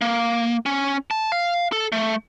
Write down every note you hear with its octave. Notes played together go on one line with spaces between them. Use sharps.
A#3
C#4
A5
F5
A4
A3